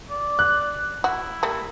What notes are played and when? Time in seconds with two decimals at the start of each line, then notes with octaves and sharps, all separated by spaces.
0.10 D5
0.39 F#6
1.04 E4 F#4
1.43 G3 A3 A#3